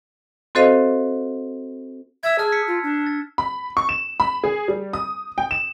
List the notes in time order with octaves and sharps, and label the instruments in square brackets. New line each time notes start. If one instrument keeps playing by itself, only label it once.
[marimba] C4 F#4 A4 C5 D#5 F5
[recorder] E5 [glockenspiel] E6 G#6
[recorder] G#4 [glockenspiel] A5 F6
[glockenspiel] E6 B6 C#7
[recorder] F4
D4
[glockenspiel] A6
[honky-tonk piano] B5
C#6
E7
B5
G#4
G3
D#6
G5
E7